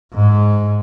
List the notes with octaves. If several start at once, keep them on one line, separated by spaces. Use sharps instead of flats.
G#2